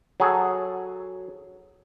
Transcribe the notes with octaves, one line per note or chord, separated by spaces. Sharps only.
F#3 G#4 A4